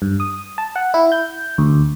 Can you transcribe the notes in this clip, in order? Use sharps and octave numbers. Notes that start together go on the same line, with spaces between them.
G2
D#6
A5
F#5
E4
G6
D2